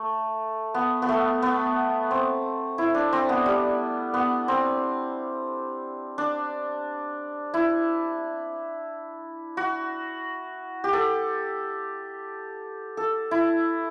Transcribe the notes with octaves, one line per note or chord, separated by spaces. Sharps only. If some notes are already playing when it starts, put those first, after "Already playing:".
Already playing: A3
B3
B3
A3
B3
C4
E4
D4
C4
B3
G3
B3
C4
D4
E4
F#4
G4
A4
A4
E4